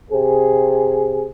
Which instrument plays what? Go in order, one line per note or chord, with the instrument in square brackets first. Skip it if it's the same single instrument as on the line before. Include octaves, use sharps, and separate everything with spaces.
[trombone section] C3 G#4